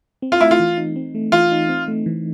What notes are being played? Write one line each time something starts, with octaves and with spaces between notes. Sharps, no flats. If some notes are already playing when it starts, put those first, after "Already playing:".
C4
F4
A3 E4
F4
E3
D#4
C4
A3
E3 F4
D#4
C4
A3
E3